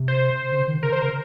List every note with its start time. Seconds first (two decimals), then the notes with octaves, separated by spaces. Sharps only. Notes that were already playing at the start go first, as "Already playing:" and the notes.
Already playing: C3
0.08 C5
0.52 C#3
0.67 D#3
0.82 C#3 A#4
0.92 C5
1.02 C#3 A#4